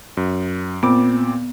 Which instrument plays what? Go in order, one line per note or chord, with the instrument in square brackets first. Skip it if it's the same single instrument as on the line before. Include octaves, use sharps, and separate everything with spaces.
[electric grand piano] F#2
[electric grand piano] A#2 C4 D6 [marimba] B3